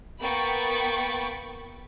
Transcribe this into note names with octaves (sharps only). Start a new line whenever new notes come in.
A#3 B3 G5 B5 C#6 A6